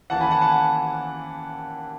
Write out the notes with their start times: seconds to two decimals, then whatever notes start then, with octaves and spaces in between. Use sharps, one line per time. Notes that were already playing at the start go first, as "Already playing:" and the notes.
0.10 D#2 C#3 E3 F#5 A5
0.21 G#5 B5
0.31 F#5 A5
0.41 F#5 A5